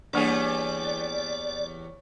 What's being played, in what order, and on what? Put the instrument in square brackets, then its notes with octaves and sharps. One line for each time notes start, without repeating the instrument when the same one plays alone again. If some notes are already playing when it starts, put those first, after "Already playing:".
[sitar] E2 G3 G#4 [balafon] A#3 D4 [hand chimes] C#5 C#6 [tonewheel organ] D5